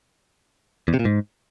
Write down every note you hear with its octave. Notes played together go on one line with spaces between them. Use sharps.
E2
C3
A#2
G#2